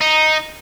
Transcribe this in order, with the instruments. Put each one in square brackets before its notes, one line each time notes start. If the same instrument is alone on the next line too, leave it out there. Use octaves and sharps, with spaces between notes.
[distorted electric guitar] D#4